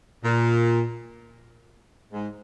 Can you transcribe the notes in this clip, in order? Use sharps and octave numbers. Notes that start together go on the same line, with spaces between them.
A#2
G#2